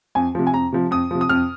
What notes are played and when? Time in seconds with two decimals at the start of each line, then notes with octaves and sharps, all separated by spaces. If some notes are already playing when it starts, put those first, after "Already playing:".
0.15 F2 G#5
0.35 C3 F3
0.47 G#5
0.54 F2 A#5
0.72 C3 F3
0.91 F2 D#6
1.11 C3 F3
1.21 D#6
1.29 F2 F6